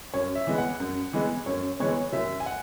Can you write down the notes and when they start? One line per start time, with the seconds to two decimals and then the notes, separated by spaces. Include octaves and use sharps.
0.14 F#2 C#5
0.35 E5
0.47 E3 G#3 B3
0.58 F#5
0.80 F#2
1.13 E3 G#3 B3
1.46 F#2 C#5
1.80 E3 G#3 B3 C#5
2.13 F#1 E5
2.40 G#5
2.46 F#5